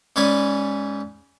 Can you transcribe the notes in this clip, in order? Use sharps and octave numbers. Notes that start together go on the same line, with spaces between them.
G#2 C#4 B4 D5 G#5 B5